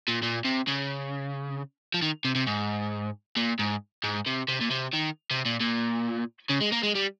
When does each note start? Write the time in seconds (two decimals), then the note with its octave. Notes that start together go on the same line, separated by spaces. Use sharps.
0.08 A#2
0.23 A#2
0.45 C3
0.68 C#3
1.94 F3
2.02 D#3
2.25 C3
2.35 C3
2.47 G#2
3.36 A#2
3.59 G#2
4.04 G#2
4.26 C3
4.49 C3
4.61 A#2
4.71 C3
4.94 D#3
5.31 C3
5.45 A#2
5.60 A#2
6.50 C#3
6.61 G#3
6.73 A#3
6.83 G#3
6.95 G3